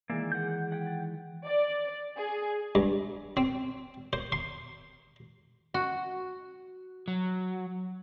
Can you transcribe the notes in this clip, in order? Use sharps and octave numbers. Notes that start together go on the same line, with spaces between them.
D#3 E3 G#3 A#3 D5 E5
F#5 G6
F#5 G5 G#6 B6
A6
D5
G#4
G2
C4
C5
C6
F#4
F#3